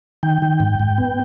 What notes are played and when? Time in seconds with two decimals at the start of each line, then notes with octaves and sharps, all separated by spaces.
0.23 D#3 G5
0.42 D#3
0.60 G#2
0.80 G#2
0.98 B3